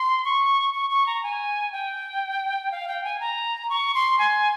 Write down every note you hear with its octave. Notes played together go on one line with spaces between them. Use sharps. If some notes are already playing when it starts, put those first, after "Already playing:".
Already playing: C6
C#6
C#6
C#6
A#5
G#5
G5
F5
G5
G#5
A#5
C#6
C6
G#5